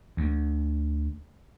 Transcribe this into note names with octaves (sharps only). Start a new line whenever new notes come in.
D2